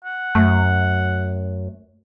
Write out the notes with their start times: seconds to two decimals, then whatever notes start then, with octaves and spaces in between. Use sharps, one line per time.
0.05 F#5
0.35 F#2 A3